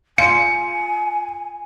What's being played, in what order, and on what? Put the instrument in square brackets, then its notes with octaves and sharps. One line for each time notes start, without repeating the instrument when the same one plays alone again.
[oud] F4 [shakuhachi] G#5 [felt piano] C#7